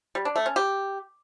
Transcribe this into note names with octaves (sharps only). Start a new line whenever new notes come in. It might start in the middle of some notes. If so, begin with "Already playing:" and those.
G3
D4
A3
C#4
G4